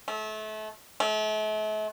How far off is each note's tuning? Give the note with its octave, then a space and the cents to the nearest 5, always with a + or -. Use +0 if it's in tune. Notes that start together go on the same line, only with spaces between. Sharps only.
A3 -30
A3 -40